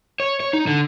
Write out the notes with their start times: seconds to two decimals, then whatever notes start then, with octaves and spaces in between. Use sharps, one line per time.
0.20 C#5
0.40 C#5
0.53 D#4
0.67 D3